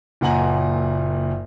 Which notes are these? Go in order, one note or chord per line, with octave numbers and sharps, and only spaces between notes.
F#1 A#2 F#5 G#5 A#5 F#7